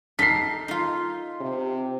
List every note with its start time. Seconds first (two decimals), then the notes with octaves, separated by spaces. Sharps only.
0.19 D#4 A4 A#4 B6 C7
0.68 D#4 F4
1.41 C3